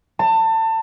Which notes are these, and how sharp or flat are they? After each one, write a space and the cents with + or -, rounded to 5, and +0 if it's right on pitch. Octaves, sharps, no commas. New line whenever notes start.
A5 +30